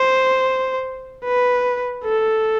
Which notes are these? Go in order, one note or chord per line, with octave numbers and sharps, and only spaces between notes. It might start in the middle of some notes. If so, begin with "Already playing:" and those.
Already playing: C5
B4
A4